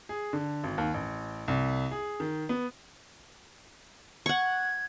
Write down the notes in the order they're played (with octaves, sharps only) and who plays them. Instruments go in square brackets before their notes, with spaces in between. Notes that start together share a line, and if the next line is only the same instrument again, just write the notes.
[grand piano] G#4
D3
G#1
D#2
A1
C2
G#4
D#3
B3
[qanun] F#5 C#6 [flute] G#6